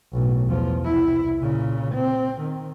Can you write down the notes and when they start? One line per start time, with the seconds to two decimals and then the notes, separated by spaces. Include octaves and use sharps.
0.13 B1 A2
0.47 E2 F3
0.82 C2 E4
1.39 A#2 C#3
1.95 C4
2.42 D#3